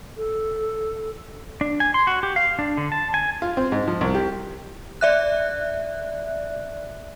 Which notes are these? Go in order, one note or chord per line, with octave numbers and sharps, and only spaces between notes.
A4
D4
G#5
C6
F#4
G4
F5
D4
D3
A5
G#5
F4
C4
G#2
F3
C2
G4
D5 E5 F#6